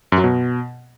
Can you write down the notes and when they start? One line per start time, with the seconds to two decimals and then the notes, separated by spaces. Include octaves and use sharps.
0.12 F#2
0.18 F#3
0.24 B2